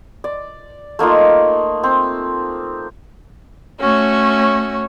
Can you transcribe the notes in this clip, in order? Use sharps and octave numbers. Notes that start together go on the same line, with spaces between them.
D5
A3 A#3 D#4 F4
C4
A3 C#4 F#4 C#5